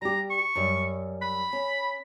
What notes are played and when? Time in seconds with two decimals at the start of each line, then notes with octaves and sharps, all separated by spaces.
0.02 G3 G4 A#5
0.30 C#6
0.55 F#2 G3
1.22 B5
1.53 C#4